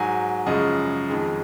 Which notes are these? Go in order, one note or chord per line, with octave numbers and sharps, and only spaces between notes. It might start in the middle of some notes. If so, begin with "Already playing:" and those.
Already playing: G#2 F#3 G#5
F#2 C#3 F3 G#3 D#5
F2 D#3 G#3